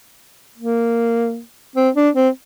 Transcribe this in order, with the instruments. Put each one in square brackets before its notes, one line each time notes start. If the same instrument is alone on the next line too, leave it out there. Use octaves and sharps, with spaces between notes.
[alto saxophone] A#3
C4
D4
C4